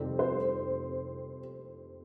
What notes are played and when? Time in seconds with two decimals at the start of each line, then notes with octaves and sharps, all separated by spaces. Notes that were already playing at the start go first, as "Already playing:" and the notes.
Already playing: F2 C3 D#3 G3 C4
0.19 C5